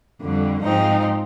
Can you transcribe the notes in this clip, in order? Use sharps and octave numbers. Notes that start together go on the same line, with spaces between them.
F2 D3 G3
G#2 F3 G#3 C4 D#4